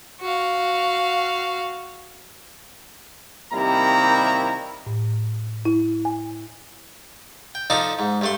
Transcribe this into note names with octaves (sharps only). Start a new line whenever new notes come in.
F#4 F5
C3 D#3 G3 A#3 E4 A#5
A2
E4
G#5
G5
F3 D#4 A4 D5 D#5 F5
G#2
G2 A3 C6